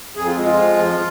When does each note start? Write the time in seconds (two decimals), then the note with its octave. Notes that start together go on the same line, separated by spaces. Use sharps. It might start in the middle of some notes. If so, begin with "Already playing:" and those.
0.16 F2 G#4
0.26 F4
0.37 G#3
0.46 F4
0.57 F3
0.78 F2